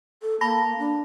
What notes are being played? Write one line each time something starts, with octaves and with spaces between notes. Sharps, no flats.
A4
A#3 A5 B5 A#6
D4